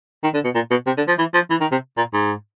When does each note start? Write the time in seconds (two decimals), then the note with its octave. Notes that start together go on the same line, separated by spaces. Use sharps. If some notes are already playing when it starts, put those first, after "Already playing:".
0.24 D#3
0.34 D3
0.44 B2
0.55 A#2
0.71 B2
0.87 C3
0.98 D3
1.08 F3
1.19 E3
1.34 F3
1.50 E3
1.61 D#3
1.71 C3
1.98 A#2
2.14 G#2